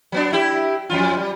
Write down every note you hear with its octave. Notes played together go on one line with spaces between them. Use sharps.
F#3 B3 D4
E4 G4
F2 F#3 F4
G3